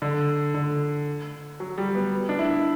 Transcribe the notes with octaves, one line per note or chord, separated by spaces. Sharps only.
D3
D3
F#3
G3
B3
D4
E4